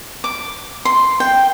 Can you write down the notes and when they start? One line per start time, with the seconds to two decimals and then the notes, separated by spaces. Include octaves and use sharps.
0.24 D6
0.85 C6
1.20 G5